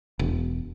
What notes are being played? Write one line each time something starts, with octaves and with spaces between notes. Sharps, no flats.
E1